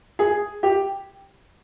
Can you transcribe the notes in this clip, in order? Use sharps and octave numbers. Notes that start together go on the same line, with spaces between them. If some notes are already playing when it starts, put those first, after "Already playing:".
G#4
G4